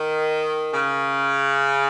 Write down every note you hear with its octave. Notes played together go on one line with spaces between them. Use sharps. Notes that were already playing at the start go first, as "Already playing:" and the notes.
Already playing: D#3
C#3